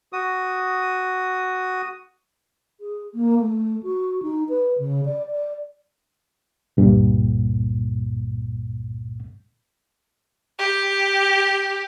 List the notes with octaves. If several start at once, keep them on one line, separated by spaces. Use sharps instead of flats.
F#4 D#6
G#4
A#3
A3
F#4
D#4
B4
C#3
D5
D5
C#2 G2 A#2
G4